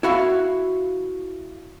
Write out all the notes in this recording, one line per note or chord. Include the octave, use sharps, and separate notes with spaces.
E4 F#4 E5 F5